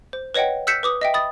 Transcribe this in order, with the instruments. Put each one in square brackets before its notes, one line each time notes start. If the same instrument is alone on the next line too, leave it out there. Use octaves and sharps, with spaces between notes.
[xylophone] C5
B4 C#5 D#5 F#5 G5
E6 F#6 G6 B6 C#7 E7
B4 D6 D#6
D#5 E5 G5
B5 D#6 A6